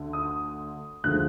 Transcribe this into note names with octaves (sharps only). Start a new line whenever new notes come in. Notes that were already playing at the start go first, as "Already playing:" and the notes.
Already playing: D2 D3
D#6
D2 D3 F3 G#3 F#6